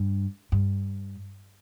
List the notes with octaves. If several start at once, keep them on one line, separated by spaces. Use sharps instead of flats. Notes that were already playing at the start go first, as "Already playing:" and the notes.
Already playing: G2
G2